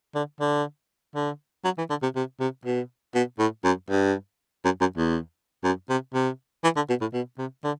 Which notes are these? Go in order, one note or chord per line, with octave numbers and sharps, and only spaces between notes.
D3
D3
D3
F#3
E3
D3
C3
C3
C3
B2
B2
A2
F#2
G2
F#2
F#2
E2
F#2
C3
C3
E3
D3
B2
A2
B2
C3
D3